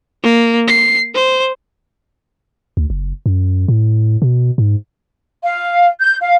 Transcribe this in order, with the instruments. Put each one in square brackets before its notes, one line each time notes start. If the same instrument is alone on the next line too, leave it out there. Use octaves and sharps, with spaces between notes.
[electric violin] A#3
C7
C5
[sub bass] D2
F#1
F#2
A2
B2
G#2
[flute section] F5
G6
F5